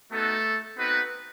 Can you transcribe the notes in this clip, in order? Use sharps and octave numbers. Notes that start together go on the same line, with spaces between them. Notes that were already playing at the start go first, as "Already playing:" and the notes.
A3 B3 D#4 F#4 A4
B3 C4 D#4 F#4 B4